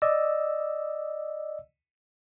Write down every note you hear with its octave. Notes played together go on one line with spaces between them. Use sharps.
D5 D#5 E6